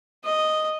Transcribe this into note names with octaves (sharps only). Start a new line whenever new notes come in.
D#5